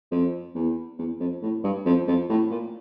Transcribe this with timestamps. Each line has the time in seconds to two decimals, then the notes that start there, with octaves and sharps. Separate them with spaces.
0.11 F2
0.55 E2
0.98 E2
1.20 F2
1.42 A2
1.64 G2
1.86 F2
2.08 F2
2.29 A2
2.51 A#2